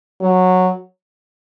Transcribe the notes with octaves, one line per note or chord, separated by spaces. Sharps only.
F#3